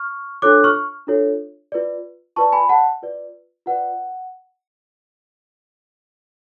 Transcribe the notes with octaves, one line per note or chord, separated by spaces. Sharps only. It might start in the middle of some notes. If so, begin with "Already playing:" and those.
Already playing: C#6 F6
D4 F4 A4 C#5 D6 F#6
C#6 F6
D4 F4 A4 C#5
F4 B4 D5
F4 B4 D5 A5 C#6
G#5 B5
F#5 A5
F4 B4 D5
F4 B4 D5 F#5